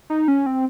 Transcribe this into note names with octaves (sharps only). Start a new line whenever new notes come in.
D#4
C#4
C4